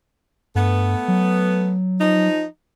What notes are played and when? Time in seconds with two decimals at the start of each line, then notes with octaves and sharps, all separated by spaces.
0.55 G2 A3 B3
1.08 F#3
2.01 F3 D#4